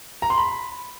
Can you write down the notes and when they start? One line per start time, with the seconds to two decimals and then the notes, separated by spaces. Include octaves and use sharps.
0.22 A#5
0.30 C6
0.38 B5